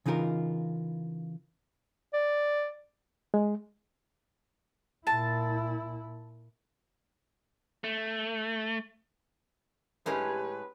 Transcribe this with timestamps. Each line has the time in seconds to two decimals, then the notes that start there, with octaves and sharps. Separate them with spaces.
0.06 C#3 E3 D#4 F4 A4 A#4
2.13 D5
3.34 G#3
5.07 A#2 E4 A5
7.84 A3
10.06 A2 G#3 C#4 G4 B4